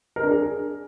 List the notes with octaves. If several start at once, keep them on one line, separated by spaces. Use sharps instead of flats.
A#4
D4
G#4